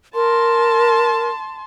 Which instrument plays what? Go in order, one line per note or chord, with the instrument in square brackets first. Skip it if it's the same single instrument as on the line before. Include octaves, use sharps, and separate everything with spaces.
[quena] A#4 [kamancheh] A5 C6